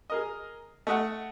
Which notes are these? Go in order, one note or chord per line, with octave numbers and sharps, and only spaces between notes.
G#4 A#4 D#5
A3 D#5 F#5